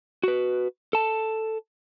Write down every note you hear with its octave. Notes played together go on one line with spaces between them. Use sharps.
F#4 B4
A4 A5